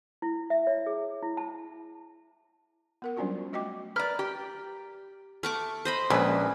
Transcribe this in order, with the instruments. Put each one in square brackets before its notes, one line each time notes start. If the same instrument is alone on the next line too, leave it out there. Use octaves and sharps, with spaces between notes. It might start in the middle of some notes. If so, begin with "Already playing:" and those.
[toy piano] E4
E5
C#5
G#4
E4
A5
[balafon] B3 A#4 F#5
F#3 G3 C#4 D4 F4 F#4
A3 F#4 D#5 G5 D6
[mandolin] A#4 F6 [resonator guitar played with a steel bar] B4 D5
[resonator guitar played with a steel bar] G4
[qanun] A3 C#6 D6 [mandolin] F6
[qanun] C5 D#5 B5
[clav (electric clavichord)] A#1 [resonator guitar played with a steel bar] G#3 B4 [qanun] C#4 [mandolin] B5